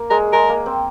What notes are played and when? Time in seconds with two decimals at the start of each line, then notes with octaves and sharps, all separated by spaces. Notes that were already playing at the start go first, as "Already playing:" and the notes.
Already playing: A#3
0.10 G#3 A#4
0.33 G#3 A#4
0.49 A#3
0.66 C4